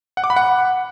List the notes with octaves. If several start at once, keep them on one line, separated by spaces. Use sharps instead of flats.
F#5
D6
B5
F#5